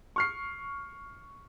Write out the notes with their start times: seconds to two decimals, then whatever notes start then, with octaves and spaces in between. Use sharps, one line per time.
0.16 C#6 F6 C7